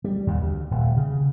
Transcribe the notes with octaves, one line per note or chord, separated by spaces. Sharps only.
G3
D#2
D2
D#1
C#3